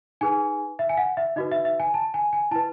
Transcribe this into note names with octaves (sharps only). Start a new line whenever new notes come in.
D#4 G#4 B4 G#5
E5
G#5
F#5
E5
D#4 F#4 B4 D#5
E5
E5
G#5
A5
G#5
G#5
E4 B4 A5